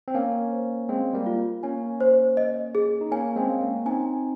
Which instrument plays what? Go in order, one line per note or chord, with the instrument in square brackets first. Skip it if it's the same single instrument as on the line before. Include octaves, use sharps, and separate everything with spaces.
[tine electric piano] C4
[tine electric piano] A#3 C#4 [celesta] F5
[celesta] C5
[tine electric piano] G#3 C4 [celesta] F5
[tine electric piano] G3 A#3
[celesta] F4
[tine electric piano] A#3 C#4 [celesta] G#5
[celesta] C5
D#5
G#4
[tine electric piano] D#4
[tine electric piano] A#3 C#4 [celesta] G#5
[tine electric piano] G#3 C4
[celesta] F5
[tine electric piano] A#3 C#4
[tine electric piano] C4 D#4 [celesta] G#5